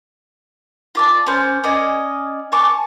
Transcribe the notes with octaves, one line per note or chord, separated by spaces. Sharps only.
F4 D5 A5
C#4 C5
C#4 D5 D#5 G#5
G#5 A5 C#6 D6